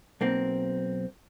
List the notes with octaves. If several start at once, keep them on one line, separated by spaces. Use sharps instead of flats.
B1 A#3 C4